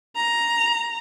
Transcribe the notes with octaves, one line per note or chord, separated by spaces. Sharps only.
A#5